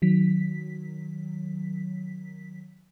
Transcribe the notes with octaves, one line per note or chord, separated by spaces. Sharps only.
D#3 F#3 B6